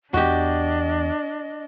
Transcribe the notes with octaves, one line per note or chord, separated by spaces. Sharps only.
E2 B3 D4 F#4 G4 D#5